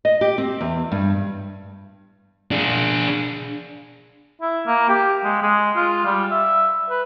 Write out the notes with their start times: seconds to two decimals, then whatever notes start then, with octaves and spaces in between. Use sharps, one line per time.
0.05 D#5
0.21 G4
0.38 C4
0.61 E2
0.92 G2
2.51 D4 G#4
4.41 E4
4.67 A#3
4.89 G4
5.24 G#3
5.42 G#3
5.76 F4
6.05 G3
6.31 E5
6.90 B4